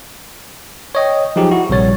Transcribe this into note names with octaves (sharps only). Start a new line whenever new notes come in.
C#5 D#5 G5
F3 F#3 D#4 G4 G#4
E4 F#4
A#1 C3 G3 C#5 A6